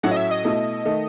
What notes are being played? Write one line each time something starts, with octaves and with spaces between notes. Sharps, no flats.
A2 F#3 C#4 E4 F#5
D#5
E5
D#5
B2 A3 E4
D#3 A3